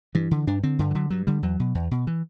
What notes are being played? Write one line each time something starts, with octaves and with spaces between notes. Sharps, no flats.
G2 E3
D3
G2 D4
D3 C4
G2 D3
E3
D3 F#3
G2 F#3
D3 G3
E2 F#3
B2
E2
B2
E3